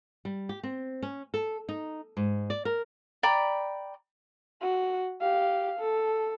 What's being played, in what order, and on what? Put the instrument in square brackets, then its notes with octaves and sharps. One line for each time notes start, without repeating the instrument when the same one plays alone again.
[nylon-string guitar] G3
G4
C4
C#4
A4
D#4
G#2
D5
A#4
[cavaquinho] D5 G5 A#5 B5
[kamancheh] F#4
G4 F5
A4